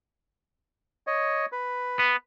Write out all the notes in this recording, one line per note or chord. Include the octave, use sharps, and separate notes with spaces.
C#5 D#5
B4
B3